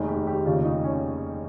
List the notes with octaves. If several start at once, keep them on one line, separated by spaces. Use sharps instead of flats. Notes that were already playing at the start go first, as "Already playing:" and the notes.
Already playing: F1 D#2 D#3 G#4
G4
G4
F1 D#2 C#3 F4
D#4
C#4